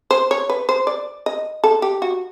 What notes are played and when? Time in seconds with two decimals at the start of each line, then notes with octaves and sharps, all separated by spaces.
0.11 C5
0.31 C#5
0.50 B4
0.69 C5
0.87 D5
1.26 D#5
1.64 A4
1.82 G4
2.02 F#4